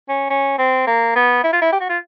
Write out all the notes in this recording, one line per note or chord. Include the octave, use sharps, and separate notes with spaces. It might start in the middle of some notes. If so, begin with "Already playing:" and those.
C#4
C#4
C4
A#3
B3
E4
F4
E4
G4
F#4
F4